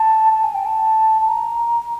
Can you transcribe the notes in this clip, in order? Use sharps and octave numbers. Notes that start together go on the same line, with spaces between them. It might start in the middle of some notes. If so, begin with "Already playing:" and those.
Already playing: A5
A5
G#5
G5
A5
A5
A#5